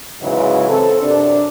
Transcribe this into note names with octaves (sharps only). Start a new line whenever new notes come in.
G#2 C#3 E3 F#3 G#3
C4 A4
F#2 C3 D4